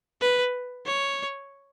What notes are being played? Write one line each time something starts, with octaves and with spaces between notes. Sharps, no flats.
B4
C#5